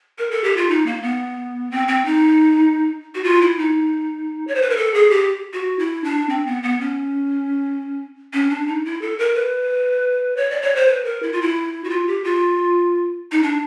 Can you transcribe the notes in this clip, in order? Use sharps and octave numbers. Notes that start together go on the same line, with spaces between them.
A#4
A4
G4
F4
D#4
A#3
B3
C4
C4
D#4
F#4
F4
E4
D#4
C#5
C5
B4
A#4
A4
G#4
G4
F#4
E4
D4
C4
B3
B3
C#4
C#4
D4
D#4
E4
A4
A#4
B4
C#5
D5
C#5
C5
B4
A#4
E4
F4
E4
F#4
F4
G4
F4
D#4
D4